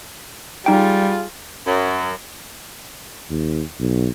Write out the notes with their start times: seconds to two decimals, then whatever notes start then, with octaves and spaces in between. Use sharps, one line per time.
0.66 G3 D#4 F4 G#4 G5
1.66 F#2
3.31 D#2
3.80 B1